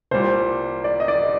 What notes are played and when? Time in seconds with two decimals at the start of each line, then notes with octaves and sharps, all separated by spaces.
0.11 C2 A#2 G3 C5
0.84 D5
1.00 D#5
1.08 D5